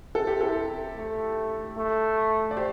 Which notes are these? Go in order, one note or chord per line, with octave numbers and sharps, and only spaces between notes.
C3 A4
G4
E4 A4
A3
A3
D5
G4 C5